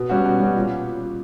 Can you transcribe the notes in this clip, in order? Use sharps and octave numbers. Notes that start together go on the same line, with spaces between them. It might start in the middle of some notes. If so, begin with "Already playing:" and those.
Already playing: B2
G3 C#4 F#4
B2
G3 C#4 F#4
A#2